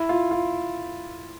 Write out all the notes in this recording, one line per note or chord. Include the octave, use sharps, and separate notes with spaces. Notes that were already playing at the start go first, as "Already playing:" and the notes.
Already playing: E4
F4
F4